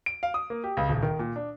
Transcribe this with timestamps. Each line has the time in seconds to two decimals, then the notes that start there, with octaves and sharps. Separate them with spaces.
0.06 D7
0.23 F5
0.34 D#6
0.50 A#3
0.64 G4
0.77 C#2
0.89 D#1
1.02 D#3
1.19 A#2
1.36 D4